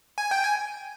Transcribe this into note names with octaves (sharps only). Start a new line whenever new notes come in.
G#5
G5
G#5